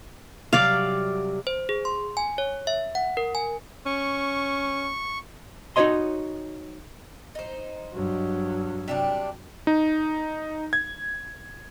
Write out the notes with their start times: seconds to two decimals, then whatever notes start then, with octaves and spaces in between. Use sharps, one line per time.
0.53 C3 F#3 G3 D5 F5
1.47 C5
1.69 G#4
1.85 C6
2.17 G#5
2.38 C#5
2.67 E5
2.95 F#5
3.17 A#4
3.35 G#5
3.86 C#4 C#6
5.76 D#4 F#4 G#4 C#5 D#5 C6
7.35 D#4 C5
7.94 G2 F#3
8.88 C3 G3 D4
9.67 D#4
10.73 G#6